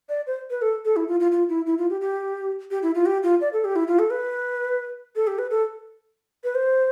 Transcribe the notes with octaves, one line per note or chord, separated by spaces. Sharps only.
D5
C5
B4
A4
A4
E4
F4
F4
F4
E4
E4
F4
G4
G4
G4
E4
F4
G4
F4
D5
A4
G4
E4
F4
A4
B4
A4
G4
B4
A4
B4
C5